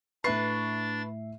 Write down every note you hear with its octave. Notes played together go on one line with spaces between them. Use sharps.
A2 D4 B4 E5 C#6 A6 C7